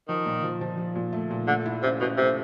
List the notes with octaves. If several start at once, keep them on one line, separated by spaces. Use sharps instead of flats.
D#3 F3
A#2
F3
F3
F3
A#2
A3
A#2
D3 A3
E4
C3 C#4
B2 E4
C3 A3